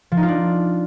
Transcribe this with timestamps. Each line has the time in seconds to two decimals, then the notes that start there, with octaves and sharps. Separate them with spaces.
0.12 F3
0.17 D#4
0.23 F4
0.28 D4